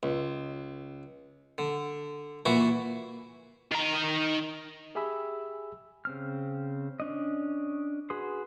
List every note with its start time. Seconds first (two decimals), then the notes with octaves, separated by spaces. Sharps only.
0.03 C#2
1.58 D3
2.45 A#2 E3 E4 F#4 C#6 D6
3.71 D#3 A#5
4.95 G4 G#4 E5 G#5 B5 E6
6.05 C#3 C4 F6
7.00 C#4 D4 D#5
8.10 F#4 G#4 B4 C6 D#6